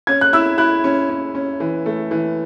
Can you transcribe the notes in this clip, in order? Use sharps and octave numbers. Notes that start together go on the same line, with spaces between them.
C#4 G#6
F#6
E4 E6
E4 F#6
C#4
C#4
C#4
E3
A3
E3